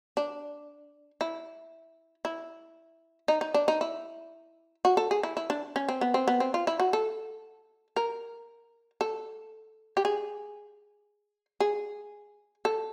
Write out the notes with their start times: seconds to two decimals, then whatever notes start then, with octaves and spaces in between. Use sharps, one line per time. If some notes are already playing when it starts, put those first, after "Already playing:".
0.17 D4
1.21 E4
2.25 E4
3.28 D#4
3.41 D#4
3.54 D4
3.68 D#4
3.81 E4
4.85 F#4
4.97 A4
5.11 G#4
5.23 E4
5.37 E4
5.50 D4
5.76 C#4
5.89 C4
6.01 B3
6.14 C4
6.28 B3
6.40 C4
6.54 F4
6.67 E4
6.80 F#4
6.93 A4
7.96 A#4
9.01 A4
9.97 G4
10.05 G#4
11.60 G#4
12.65 A4